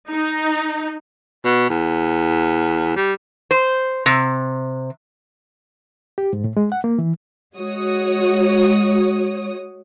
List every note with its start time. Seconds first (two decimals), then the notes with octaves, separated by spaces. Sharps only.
0.11 D#4
1.45 B2
1.70 E2
2.96 G3
3.51 C5
4.06 C3
6.18 G4
6.33 G#2
6.44 A2
6.57 G#3
6.72 F#5
6.84 A#3
6.98 E3
7.55 G#3 F#4 C#5 D#6